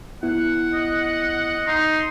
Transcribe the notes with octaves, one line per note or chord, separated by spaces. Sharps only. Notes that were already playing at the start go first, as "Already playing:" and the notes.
B3 E4 F#5
D#5
D#4 C6